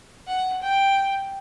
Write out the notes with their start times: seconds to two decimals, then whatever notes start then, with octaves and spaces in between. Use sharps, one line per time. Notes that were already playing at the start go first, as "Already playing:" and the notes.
0.28 F#5
0.62 G5